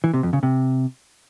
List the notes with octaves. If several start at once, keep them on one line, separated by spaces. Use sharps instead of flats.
E3
C3
F2
C#3
C3